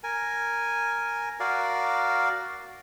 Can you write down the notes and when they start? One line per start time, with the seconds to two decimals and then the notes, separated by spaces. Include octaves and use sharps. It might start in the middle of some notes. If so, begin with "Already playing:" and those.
0.03 A#4 G#5
1.40 F#4 A#4 D5 F5